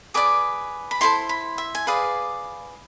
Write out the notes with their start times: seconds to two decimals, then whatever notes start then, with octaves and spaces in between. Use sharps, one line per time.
0.14 G#4 B4 D5 D6
0.91 B5
1.01 E4 A4 C5 C6
1.29 B5
1.58 E5
1.75 G#5
1.87 G#4 B4 D5 F5